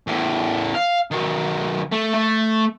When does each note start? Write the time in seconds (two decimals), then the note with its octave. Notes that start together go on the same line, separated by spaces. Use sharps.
0.07 E2 A2
0.75 F5
1.11 D#3 F#3
1.92 A3
2.14 A3